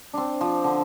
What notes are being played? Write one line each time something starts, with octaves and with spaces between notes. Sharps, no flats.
C4 D4
F3
D3